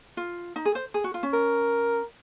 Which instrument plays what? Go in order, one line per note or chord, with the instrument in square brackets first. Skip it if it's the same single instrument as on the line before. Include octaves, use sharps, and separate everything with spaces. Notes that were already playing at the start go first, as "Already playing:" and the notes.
[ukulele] F4
D#4
G#4
C5
G#4
F#4
F4
C#4
[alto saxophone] A#4